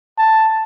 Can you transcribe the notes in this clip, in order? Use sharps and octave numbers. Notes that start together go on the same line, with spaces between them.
A5